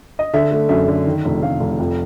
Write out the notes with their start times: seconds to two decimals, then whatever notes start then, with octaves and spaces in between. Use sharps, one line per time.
0.19 D#5
0.34 D3 E5
0.51 A3
0.69 F#2 E5
0.88 D3
1.06 D#3
1.25 F1
1.42 F1 F5
1.60 F1
1.80 F2